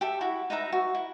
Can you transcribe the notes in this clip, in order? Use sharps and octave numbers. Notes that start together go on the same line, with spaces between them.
G4 A4 E5
E4 F#4
D#4 B4 E5 A#5
F#4
E4